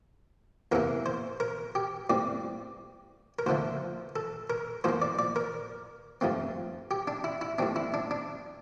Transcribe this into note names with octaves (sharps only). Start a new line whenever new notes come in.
E2 C3 E3 A#3 A#4
C5
A#4
G4
A2 G3 C4 D5
A#4
D2 D3 F3 A3 C5
A4
A#4
A2 F3 A#3 C5
D5
D5
A#4
G2 F3 A3 C4
G4
D4
E4
E4
A2 G3 C4 D4
E4
D4
D4